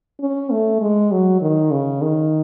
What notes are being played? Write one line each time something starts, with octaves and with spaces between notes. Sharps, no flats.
C#4
A3
G#3
F#3
D#3
C#3
D#3